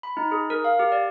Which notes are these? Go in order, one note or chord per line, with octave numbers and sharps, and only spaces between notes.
B5
D#4
G#4
A#4
F5
G4
D5